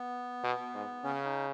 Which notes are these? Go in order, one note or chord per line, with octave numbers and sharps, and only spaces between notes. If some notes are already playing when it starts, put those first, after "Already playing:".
Already playing: B3
B2
G#2
C#3 C#4
D#4